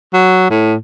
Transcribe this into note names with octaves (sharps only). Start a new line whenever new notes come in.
F#3
A2